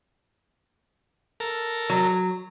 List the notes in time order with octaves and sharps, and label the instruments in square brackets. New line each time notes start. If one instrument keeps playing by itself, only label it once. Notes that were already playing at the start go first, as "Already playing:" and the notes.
[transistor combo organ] A4 A#4
[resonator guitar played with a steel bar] F#3